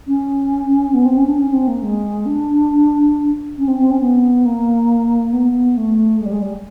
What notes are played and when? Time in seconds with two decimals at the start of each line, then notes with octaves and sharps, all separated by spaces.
0.07 C#4
0.94 B3
1.06 C4
1.17 C#4
1.27 D4
1.38 C#4
1.53 C4
1.67 A#3
1.82 G#3
2.26 D4
3.58 C#4
3.68 C4
3.79 C4
3.91 C#4
4.01 B3
4.45 A#3
5.33 B3
5.77 A3
6.20 G#3
6.26 G3
6.32 G#3
6.42 G3